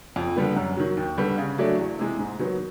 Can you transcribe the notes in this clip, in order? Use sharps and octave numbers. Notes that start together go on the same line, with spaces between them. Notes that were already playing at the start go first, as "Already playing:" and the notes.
F2
D3 G3 B3
F#2
D#3 F#3
D#2
D3 G3 B3
C#3
F#3 A3 D4
E2
C3 E3 G#3
G#2
D#3 F#3 B3